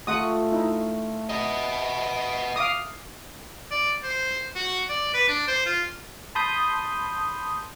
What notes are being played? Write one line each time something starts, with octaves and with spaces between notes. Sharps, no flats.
A3 F4 F#5 C#6 D#6
D#4 E4
B3 D#5 A#5
F5 D6 D#6
D5
C5
F#4
D5
B4
D4
C5
F4
A5 B5 C6 D#6 G6